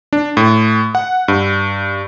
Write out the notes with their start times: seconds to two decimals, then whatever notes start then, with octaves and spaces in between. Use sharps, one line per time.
0.13 D4
0.37 A2
0.95 F#5
1.28 G2